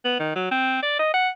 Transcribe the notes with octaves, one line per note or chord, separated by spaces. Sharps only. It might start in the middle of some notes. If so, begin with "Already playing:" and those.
B3
D#3
F#3
C4
D5
D#5
F#5